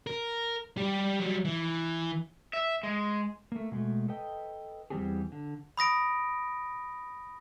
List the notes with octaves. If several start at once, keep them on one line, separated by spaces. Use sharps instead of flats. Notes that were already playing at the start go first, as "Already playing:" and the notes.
A#4
G3 G4
F#3 G3
E3
E5
G#3
A3 A#3
B2 G#3 A3
A4 B4 D#5 G5
E2 E3 G3 C4 G4 G#4
D3
B5 D#6 A#6 D7